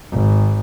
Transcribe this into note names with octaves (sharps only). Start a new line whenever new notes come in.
G#1